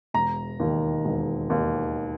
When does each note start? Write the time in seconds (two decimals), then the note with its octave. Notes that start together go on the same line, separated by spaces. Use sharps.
0.14 E1 A#5
0.60 D#2 D#3
1.05 E1
1.50 D#2 D#3